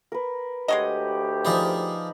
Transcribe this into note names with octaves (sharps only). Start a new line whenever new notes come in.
A#4 B4
D2 G#3 G4 C#5 D#5 F#5
F3 D#4 G#4 C5 D5 B5